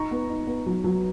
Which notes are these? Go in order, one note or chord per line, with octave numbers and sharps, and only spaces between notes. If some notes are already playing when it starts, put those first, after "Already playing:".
Already playing: D#4 A#5 C#6
B3
D#4
B3
F#3
F#3